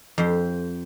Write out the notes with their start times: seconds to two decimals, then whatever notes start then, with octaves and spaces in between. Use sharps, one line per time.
0.18 F2 G4 C5